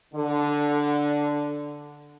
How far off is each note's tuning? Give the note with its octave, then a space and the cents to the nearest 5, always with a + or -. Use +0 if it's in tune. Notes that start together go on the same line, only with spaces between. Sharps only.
D3 +0